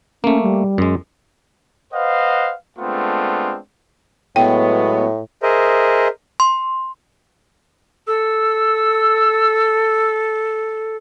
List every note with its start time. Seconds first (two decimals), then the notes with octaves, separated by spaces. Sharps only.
0.24 A3 A#3 C#4
0.42 G3
0.78 F#2 G#3
1.94 B4 C5 D#5 F5 F#5
2.79 G#3 A3 B3 C4 D4 F4
4.36 A2 F#3 G#3 B3 G5
5.43 G#4 A#4 C5 D#5 E5
6.40 C6
8.07 A4 E6